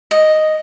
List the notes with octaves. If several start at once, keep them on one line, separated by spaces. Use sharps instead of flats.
D#5